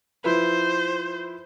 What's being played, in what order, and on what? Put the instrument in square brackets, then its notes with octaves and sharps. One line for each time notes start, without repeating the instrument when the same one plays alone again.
[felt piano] F3 E4 B4 [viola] C5